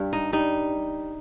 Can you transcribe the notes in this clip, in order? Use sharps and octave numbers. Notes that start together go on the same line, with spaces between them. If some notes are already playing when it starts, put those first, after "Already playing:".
Already playing: G2 G3
D#4
G3 D#4